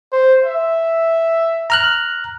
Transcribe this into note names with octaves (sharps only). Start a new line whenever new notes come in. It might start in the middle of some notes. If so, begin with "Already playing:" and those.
C5
E5
A#5 F6 F#6